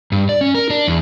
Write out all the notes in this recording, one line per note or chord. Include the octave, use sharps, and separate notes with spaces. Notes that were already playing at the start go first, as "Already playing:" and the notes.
G2
D5
C#4
A#4
D4
E2